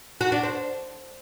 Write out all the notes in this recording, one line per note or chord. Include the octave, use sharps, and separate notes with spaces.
F#4
D4
C5